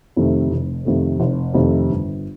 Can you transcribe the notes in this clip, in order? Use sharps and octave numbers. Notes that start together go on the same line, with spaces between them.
F2 C3 D#3 A3
F1
F2 C3 D#3 A3
F1
F2 C3 D#3 A3
G1